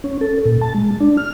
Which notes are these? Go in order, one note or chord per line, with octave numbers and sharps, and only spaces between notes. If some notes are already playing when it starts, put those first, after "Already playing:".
C#4
A4
A#2
A5
G#3
D4
F6